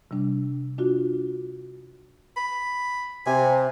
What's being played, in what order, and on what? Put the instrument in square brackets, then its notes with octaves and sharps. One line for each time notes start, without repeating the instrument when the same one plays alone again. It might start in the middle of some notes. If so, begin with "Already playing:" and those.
[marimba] C3 G3 D4
D4 F4 F#4
[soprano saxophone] B5
[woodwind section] C3 [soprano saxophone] G#5